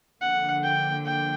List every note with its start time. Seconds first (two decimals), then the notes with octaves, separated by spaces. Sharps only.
0.20 D3 F3 A#3 F#5
0.63 G5
1.05 G5